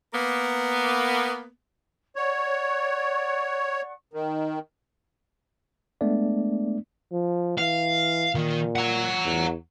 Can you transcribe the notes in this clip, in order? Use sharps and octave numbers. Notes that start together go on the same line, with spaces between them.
A#3 B3
C#5 D5 F#5 C#6
D#3
G#3 A3 B3 D4 D5
F3
E3 F5
A#2 D#3
F#5 A#5
E2